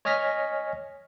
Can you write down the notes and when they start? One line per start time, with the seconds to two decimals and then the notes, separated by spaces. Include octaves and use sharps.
0.05 C#5 D#5 G#5 F6 A#6 B6